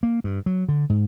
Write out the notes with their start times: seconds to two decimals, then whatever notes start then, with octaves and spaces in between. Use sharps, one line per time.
0.03 A#3
0.24 G2
0.46 F#3
0.69 D3
0.90 G#2